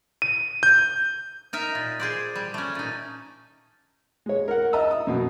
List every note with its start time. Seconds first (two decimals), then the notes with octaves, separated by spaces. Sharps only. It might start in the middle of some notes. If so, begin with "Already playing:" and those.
0.22 D#7
0.63 G6
1.53 D#4 A#4 E5
1.75 A#2
1.99 G#4 C5 D5
2.35 G3
2.54 A3 C#4
2.75 A#2 D#4
4.26 G#3 C#5
4.48 A#4 F#5
4.73 D#5 E5 A5 A#5 E6
4.91 D#6
5.07 F#2 B2 F#3